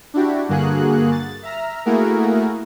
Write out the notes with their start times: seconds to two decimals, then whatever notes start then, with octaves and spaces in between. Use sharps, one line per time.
0.14 D4 E4 F#4 G4
0.49 G2 D3 A#3 F#4 G#4 F#6
1.12 A6
1.43 E5 A#5 F6
1.85 A3 A#3 E4 F#4 G#4 A#4